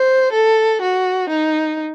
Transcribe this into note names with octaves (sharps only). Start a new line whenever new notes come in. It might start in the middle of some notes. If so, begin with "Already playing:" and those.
Already playing: C5
A4
F#4
D#4